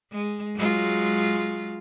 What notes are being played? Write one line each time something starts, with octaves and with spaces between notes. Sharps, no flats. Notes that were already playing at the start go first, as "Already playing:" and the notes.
G#3
F#3 G#3 F4